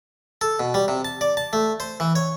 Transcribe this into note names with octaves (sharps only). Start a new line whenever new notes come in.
A4
B2
G3
C3
A5
D5
A5
A3
C5
E3
C#5